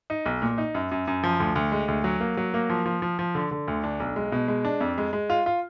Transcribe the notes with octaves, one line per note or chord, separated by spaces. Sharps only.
D#4
B1
A#2
D#4
F#2
F#2
F#2
F3
D2
D2
G#3
D2
F#3
A#3
F#3
A#3
F3
F3
F3
F3
D3
D3
D2
D4
B1
G#3
B2
G#3
D4
F2
G#3
G#3
F4
F4